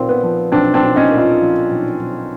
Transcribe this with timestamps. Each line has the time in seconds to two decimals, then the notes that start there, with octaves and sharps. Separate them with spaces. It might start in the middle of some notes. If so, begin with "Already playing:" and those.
Already playing: B1 A#2 C4
0.09 B3
0.23 F3
0.52 B1 C4 D4
0.74 C4 D4
0.82 B1
0.96 C#4 D#4
1.12 A#2
1.18 D#4 F4
1.41 F3
1.71 B1
1.99 B1